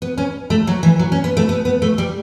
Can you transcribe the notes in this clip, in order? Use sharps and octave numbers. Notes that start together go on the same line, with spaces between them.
B3
C#4
A3
F#3
E3
F#3
C#4
B3
A3
B3
B3
A3
G3